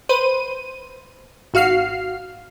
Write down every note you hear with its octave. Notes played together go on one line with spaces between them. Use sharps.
B4 C5 D#7
G#1 F#4 F5 F6 C7